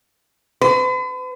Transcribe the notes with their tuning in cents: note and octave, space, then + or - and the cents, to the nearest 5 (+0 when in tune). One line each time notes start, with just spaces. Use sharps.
B4 +45